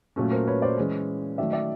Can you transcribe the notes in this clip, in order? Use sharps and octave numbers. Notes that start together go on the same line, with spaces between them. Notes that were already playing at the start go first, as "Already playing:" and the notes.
A#2 F#3 A3 C#4
A#4 C5
B4 C#5
C5 D5
E3 G#3 C#4
D#3 F#3 A3 D5 E5
D5 E5